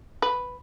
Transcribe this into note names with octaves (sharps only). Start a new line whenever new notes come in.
B4